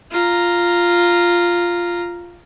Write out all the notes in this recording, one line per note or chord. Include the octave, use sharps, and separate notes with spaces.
F4 A#5